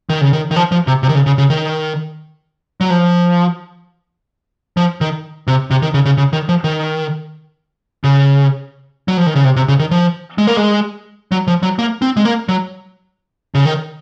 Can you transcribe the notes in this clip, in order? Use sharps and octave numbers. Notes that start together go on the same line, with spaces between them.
D#3
C#3
D#3
D#3
F3
F3
C3
C3
D#3
C#3
C#3
C#3
D#3
F#3
F3
F3
D#3
C3
C3
D#3
C#3
C#3
C#3
D#3
F3
D#3
C#3
F#3
F3
D#3
C#3
C3
C3
C#3
D#3
F3
G#3
A#3
G#3
F#3
F3
F#3
A#3
C4
G#3
A#3
F#3
C#3
D#3